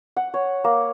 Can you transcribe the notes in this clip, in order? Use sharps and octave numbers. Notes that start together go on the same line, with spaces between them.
F#5
C#5
A#3